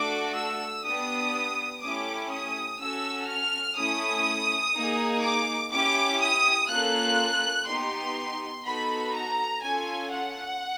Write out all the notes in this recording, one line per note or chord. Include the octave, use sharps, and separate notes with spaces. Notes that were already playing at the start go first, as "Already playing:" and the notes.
Already playing: A3 D4 F#4 A4 D6
E6
B3 D4 G4 D#6
A3 C#4 E4 G4 D6
D#6
C#4 F#4 A4 E6
F6
A3 C#4 E4 D#6
A#3 D#4 G#4
D6
C#4 E4 G4 D6
D#6
A#3 C#4 F4 A4 F#6
B3 D#4 G4 C6
B3 D#4 F#4 A4 B5
A#5
C#4 F4 A4 G#5
F#5